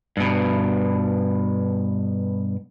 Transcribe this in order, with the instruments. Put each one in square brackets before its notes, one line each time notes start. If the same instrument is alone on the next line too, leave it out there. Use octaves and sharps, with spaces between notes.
[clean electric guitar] G2 B2